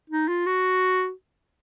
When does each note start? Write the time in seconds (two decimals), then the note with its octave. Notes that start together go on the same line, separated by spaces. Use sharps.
0.10 D#4
0.28 F4
0.46 F#4